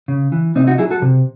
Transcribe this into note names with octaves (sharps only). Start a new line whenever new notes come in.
C#3
E3
C3 C4 D#4
D#4 F#4
F#3 E4 G#4
F#4 A4
C3